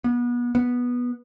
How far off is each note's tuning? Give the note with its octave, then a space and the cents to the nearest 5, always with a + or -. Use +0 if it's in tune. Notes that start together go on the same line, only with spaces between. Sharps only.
B3 -30
B3 -10